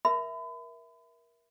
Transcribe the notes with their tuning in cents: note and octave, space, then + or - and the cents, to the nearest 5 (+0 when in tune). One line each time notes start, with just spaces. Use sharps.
A#4 +20 E5 +0 B5 +40